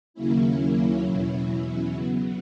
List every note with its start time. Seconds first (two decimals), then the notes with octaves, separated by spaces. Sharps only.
0.14 D#2 C#3 F#3 A#3 C#4 E4
1.03 E2 B2 F#3 C#4 E4
1.92 C#3 F#3 B3